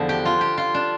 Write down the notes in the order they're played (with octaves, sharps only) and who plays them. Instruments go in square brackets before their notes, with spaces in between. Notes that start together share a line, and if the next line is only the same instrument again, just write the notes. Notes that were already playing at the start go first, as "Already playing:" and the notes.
Already playing: [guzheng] E2 D3 F3
G4
F4
G4
F4
D4